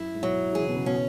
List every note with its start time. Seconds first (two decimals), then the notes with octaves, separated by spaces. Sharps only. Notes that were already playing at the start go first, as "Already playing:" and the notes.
Already playing: F#2 E4
0.15 G#2
0.23 B2 F#3
0.55 E3 G#4
0.62 C#3
0.69 B2
0.76 C#3
0.86 B2 C#4